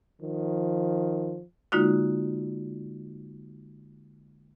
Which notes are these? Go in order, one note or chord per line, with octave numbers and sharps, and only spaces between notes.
D#3 F3
D3 G#3 A#3 D#4 F4 F#4